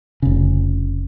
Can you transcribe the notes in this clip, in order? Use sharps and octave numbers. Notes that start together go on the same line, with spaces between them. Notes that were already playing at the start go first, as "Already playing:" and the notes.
F1 C#3